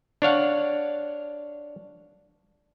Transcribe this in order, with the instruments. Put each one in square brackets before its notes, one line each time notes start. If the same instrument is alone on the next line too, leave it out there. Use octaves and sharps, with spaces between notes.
[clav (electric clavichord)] D4 C#5 F5 F#5